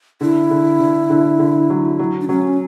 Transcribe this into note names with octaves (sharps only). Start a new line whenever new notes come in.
D3 E4
D3
D3
D3
D3
F#3
F#3
D4
F#3 C#4